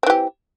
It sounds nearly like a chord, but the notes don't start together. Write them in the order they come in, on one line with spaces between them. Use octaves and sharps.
C4 E3 G4